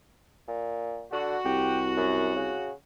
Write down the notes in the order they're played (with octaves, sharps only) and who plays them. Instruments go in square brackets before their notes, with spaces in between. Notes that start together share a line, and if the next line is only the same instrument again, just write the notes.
[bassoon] A#2
[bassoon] D3 [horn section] F#4
[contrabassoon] C2 [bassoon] G4
[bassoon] F#2
C#3